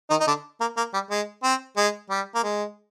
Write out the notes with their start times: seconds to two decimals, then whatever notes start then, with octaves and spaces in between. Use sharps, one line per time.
0.10 D#3 D#4
0.20 D#4
0.27 D3 D4
0.61 A#3
0.77 A#3
0.94 G3
1.10 G#3
1.43 C4
1.77 G#3
2.10 G3
2.35 A#3
2.43 G#3